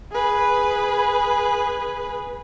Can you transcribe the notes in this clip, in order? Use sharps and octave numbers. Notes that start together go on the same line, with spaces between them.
G#4 B4